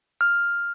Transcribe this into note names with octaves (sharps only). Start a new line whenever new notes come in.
F6